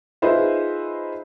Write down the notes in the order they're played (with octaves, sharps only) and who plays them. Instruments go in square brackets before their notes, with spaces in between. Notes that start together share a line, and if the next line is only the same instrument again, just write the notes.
[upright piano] D#4 F4 G#4 B4 C5 E5